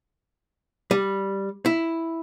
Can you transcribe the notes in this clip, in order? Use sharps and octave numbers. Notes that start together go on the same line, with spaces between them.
G3
E4